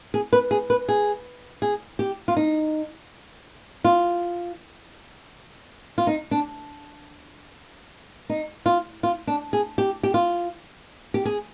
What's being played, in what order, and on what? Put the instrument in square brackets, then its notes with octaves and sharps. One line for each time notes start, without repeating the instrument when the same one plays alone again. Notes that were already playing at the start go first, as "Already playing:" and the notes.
[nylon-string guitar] G#4
B4
G#4
B4
G#4
G#4
G4
F4
D#4
F4
F4
D#4
D4
D#4
F4
F4
D4
G#4
G4
G4
F4
G4
G#4